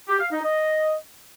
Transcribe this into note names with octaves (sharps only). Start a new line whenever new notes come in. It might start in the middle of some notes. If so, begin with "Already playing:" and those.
G4
F5
D#4
D#5